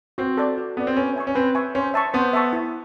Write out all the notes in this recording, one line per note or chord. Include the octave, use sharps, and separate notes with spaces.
C4 F#4
A4 D5
F#4
B3 A4 D5
C4
C#4 B4
E5 G#5 C#6
C#4
C4 B4
E5 G#5 C#6
C#4 C5
E5 A5 C#6
B3 C5
E5 A5 C#6
E4